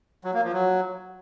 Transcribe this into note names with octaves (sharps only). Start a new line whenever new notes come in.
F#3
A#3
F3
F#3